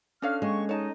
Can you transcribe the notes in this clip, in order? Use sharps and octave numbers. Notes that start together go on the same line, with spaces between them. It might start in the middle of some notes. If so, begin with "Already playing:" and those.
C#4 D4 A4 C#5 F5 F6
G#3 A#3 G5 C#6
D#4 C#5 A5